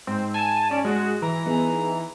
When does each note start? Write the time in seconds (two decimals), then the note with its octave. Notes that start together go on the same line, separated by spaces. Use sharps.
0.07 G#2 C4
0.34 G#5 A5
0.71 C#4 D5
0.84 G#3 F#4
1.22 E3 A#5
1.46 B3 D#4 G#4